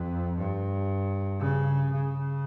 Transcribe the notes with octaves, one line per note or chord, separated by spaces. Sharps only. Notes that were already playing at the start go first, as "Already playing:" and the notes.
Already playing: F2
G2
C#3
C#3